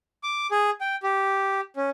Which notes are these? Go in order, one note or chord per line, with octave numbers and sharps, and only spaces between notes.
D6
G#4
G5
G4
C#4